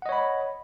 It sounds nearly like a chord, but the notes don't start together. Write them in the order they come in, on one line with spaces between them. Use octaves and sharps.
F#5 D#5 C#5 B5